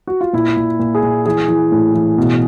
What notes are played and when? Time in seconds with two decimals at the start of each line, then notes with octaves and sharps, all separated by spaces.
0.07 F#4
0.21 F4
0.33 A#2 E4
0.57 A#2
0.79 A#2
0.95 G#4
1.03 A#2
1.26 E3 G#4
1.48 E3
1.72 A2
1.94 E3
2.18 B2